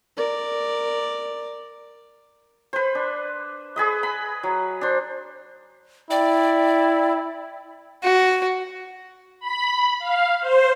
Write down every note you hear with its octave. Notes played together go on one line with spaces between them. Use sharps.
A#4 D5
B4 C5
D4
G#4 B4 D#5
B5
F#3
D4 C5
E4 D5 G5
F#4
B5
F5
C5